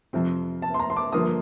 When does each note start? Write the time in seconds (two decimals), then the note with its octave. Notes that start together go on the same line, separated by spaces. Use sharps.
0.13 F2 C3 F3 C4
0.62 A5
0.74 C6
0.80 A#5
0.90 C6
0.96 D6
1.12 G2 D3 F3 A#3 D#6